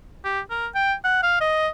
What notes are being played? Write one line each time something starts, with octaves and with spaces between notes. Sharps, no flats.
G4
A#4
G5
F#5
F5
D#5